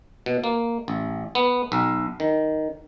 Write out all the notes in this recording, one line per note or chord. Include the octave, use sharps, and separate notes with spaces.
B2
A#3
A1
B3
B1
D#3